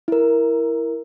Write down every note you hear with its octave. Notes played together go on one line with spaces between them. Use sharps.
E4 A#4